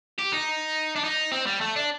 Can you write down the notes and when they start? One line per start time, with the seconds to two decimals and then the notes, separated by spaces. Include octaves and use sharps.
0.18 G4
0.32 D#4
0.96 D4
1.04 D#4
1.32 C4
1.46 G3
1.61 A3
1.76 D4